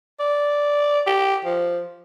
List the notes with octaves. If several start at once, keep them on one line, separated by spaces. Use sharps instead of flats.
D5
G4
F3